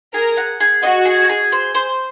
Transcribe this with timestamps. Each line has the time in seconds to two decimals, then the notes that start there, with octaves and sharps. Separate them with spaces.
0.14 G#4 A#4
0.37 F#5
0.60 G#4
0.82 F#4 D#5
1.05 G#4
1.29 G#4
1.52 C5
1.75 C5